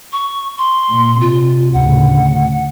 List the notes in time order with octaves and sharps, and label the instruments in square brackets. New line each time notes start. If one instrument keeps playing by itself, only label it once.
[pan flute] C#6
C6
[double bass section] A#2
[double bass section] C3 [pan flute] F4
[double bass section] D2 A2 C#3 [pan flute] F#5